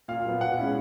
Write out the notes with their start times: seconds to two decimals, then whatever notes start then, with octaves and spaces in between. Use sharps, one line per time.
0.08 A#2 F5
0.25 F#3 B3
0.41 B2 F#5
0.57 G#3 C#4 E4